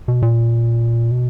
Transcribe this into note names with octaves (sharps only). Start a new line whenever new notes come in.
B2
A#2
B2